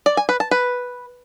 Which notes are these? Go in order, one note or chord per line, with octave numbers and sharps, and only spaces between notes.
D5
G#5
B4
A5
B4